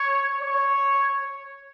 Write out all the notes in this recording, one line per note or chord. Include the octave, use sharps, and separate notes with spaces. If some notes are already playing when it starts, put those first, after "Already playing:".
Already playing: C#5
C#5